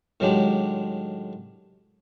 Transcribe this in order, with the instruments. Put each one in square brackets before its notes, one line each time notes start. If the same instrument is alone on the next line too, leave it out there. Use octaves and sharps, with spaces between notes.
[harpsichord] A2 D#3 F#3 G#3 D4 G4